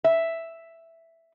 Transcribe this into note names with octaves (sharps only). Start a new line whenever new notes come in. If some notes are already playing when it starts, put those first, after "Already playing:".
E5